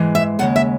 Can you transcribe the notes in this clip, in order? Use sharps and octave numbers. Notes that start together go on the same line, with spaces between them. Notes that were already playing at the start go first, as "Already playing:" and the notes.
Already playing: G#2 E3 G#3
E5
D#2 C#3 G#3 F#5
E5